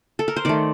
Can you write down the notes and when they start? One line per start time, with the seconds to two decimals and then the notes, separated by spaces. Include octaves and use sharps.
0.19 A4
0.28 A#4
0.36 C5
0.45 D#3 A3 D5